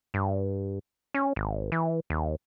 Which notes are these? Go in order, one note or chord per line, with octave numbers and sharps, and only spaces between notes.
G2
C#4
G#1
E3
D#2